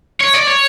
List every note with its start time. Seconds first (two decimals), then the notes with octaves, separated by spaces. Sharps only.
0.20 C#5
0.34 D5
0.47 C#5